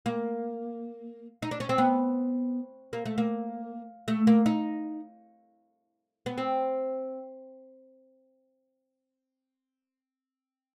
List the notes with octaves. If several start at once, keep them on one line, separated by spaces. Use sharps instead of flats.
A#3
D#4
D4
C#4
C4
B3
A#3
A3
A#3
A3
A#3
D#4
B3
C4